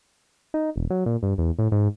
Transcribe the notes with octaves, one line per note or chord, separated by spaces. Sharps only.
D#4
E1
F#3
A#2
G2
E2
A2
G#2